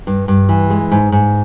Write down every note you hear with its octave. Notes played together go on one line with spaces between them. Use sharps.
G2
G2
E3
G#3
G#2
G#2